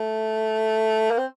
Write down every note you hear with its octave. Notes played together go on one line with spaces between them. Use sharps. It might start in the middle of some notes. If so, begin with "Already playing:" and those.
Already playing: A3
A#3
C4